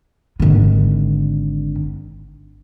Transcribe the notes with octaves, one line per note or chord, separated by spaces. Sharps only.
G#1 D3